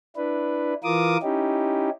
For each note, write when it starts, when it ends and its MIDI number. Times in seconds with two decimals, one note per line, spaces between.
0.16 0.74 62
0.16 0.74 64
0.16 0.74 71
0.83 1.17 52
0.83 1.17 65
0.83 1.17 70
0.83 1.17 86
0.83 1.17 87
1.22 1.90 61
1.22 1.90 63
1.22 1.90 64
1.22 1.90 67